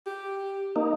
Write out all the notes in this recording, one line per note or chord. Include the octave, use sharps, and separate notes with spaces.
G4
A#3 D#4